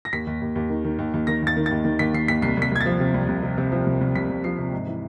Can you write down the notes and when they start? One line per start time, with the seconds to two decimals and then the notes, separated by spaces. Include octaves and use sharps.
0.05 A#6
0.13 D#2 B6
0.27 D#2
0.41 D#2
0.56 D#2
0.70 D#3
0.84 D#3
0.99 D#2
1.14 D#2
1.27 D#3 A#6
1.42 D#2 A6
1.57 D#3
1.66 A6
1.71 D#2
1.84 D#3
1.99 D#2 B6
2.14 D#3 C7
2.28 D#2 B6
2.42 C2 C7
2.57 C2 B6
2.72 C2 G#6
2.81 A6
2.86 F3
3.00 C3
3.14 C2
3.28 C2
3.43 C3
3.58 C3
3.72 F3
3.86 C2
4.01 C2
4.15 C2 B6
4.30 C2
4.44 F3 C7
4.58 C3
4.73 G#2
4.87 E3